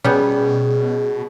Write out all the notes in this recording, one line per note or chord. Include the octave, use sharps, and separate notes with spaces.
B2 G3 B3 C#4 G#4